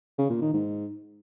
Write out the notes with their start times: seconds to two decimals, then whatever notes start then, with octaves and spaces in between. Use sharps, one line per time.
0.18 C#3
0.30 A#2
0.42 D#3
0.54 G#2